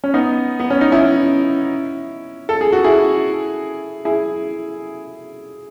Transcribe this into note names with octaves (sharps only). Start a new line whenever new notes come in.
C#4
B3 D#4
B3
C#4
D#4
C#4 E4
A4
G#4
F#4
E4 G#4
E4 G#4